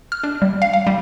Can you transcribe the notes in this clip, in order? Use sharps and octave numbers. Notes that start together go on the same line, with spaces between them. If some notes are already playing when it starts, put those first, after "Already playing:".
F6
D4
G3
F5
F5
G3